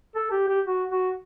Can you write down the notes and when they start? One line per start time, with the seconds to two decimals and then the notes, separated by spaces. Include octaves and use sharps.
0.15 A4
0.32 G4
0.48 G4
0.66 F#4
0.91 F#4